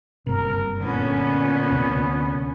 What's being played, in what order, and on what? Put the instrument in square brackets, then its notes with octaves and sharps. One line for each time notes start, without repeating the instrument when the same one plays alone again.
[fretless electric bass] F#1 G2 C3 [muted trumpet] A#4
[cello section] A#2 D3 C#4 [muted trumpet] B3
[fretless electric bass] D2 C3 C4